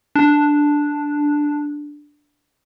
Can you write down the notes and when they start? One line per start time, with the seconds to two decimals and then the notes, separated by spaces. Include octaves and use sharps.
0.16 D4